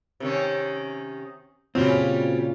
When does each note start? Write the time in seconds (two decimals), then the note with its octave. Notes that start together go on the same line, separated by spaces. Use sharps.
0.20 C3 D#3 C#4
1.75 A#2 C#3 F#3 G3 C4 C#4 F4